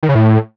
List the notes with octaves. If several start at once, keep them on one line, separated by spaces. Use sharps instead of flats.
D#3
C#3
A2